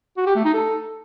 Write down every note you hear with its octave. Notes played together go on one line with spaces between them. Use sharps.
F#4
G4
A3
D#4
A4